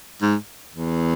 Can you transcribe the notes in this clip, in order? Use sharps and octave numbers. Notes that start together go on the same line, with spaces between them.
G#2
E2